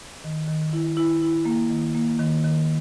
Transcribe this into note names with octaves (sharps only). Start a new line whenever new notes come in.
D#3
D#3
E4
E4
E4
A#3
D#3
A#3
D#3
D#3